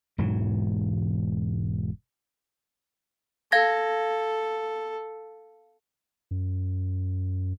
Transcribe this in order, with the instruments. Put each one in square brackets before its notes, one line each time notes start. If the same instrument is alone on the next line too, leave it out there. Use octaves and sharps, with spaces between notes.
[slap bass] E1 G#2 E3 F#3
[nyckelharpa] A4 [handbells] F5 G#6 A#6
[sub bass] F#2